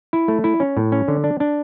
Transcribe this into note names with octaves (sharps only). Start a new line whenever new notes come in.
E4
A3
E4
C#4
A2
C#4
D3
D4
D4